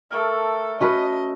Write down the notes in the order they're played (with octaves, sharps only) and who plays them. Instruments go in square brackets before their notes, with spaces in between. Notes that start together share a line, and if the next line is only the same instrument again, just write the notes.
[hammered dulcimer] A3 G4 A#4 [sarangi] A4
[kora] C#4 F#4 B4 [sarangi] D#5 [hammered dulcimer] A5